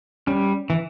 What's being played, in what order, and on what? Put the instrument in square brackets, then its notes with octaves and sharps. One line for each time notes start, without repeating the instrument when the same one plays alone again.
[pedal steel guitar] G3 [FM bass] C#4
[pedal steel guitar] E3